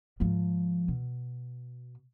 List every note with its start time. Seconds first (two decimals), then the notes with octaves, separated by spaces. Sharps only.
0.20 G#2 F3
0.88 B2